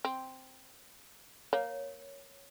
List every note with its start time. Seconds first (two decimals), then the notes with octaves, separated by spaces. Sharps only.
0.05 C4
1.53 A#3 C#5